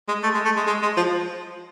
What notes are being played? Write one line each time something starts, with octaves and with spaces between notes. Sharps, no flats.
G#3
A3
G#3
A3
G#3
G#3
G#3
F3